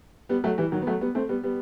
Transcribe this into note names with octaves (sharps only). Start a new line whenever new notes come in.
G3 B3
F#3 A3
E3 G3
D#3 F#3
B3
F#3 A3
G3 B3
A3 C4
G3 B3
G3 B3